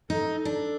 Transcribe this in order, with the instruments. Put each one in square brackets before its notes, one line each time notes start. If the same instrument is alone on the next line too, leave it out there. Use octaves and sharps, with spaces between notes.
[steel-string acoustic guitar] D#4 [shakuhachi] A4
[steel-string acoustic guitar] D4